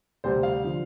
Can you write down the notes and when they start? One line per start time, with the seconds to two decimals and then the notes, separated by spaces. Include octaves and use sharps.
0.24 D2 C3 G3 C5
0.43 F5
0.64 D3 F3